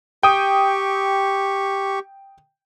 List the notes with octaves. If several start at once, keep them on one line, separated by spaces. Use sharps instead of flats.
G4 G5 C#6 D#6